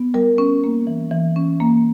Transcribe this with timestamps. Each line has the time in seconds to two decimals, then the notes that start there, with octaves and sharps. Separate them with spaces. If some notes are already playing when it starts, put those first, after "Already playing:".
Already playing: B3
0.14 G3 A#4
0.38 C#4
0.64 A#3
0.87 E3
1.11 E3
1.36 C#4
1.60 A#3